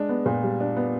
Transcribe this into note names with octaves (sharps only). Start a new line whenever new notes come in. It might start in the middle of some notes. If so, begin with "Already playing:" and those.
Already playing: G#3 D4
B3
A#2
G3
D4
B3